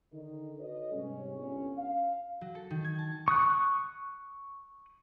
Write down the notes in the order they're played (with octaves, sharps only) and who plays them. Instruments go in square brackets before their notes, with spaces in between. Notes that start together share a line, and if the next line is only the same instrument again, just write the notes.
[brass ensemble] D3 D#3 D#4
F#4 A4 B4 C#5 D#5
G#2 C3 G3 G#3 C#4
G1 C#4
F5
[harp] F#3
A4
D#3
G#6
A5
[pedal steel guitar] C#6 D#6 F#6